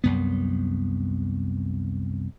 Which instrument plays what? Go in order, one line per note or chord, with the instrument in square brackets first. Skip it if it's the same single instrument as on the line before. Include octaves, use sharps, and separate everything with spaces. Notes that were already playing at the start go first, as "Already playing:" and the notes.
[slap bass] C2 F#2 B3